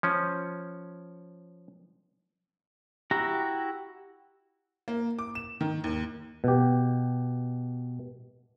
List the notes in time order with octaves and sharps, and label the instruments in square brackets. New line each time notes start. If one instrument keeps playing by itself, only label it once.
[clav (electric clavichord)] F3 C#4
[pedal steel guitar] E4 F#4 G4 A#5
[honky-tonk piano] A#3
D6
E7
D#3
D#2
[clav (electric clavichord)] B2 G4